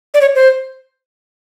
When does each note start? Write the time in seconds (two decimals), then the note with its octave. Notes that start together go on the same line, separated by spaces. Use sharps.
0.14 D5
0.21 C#5
0.35 C5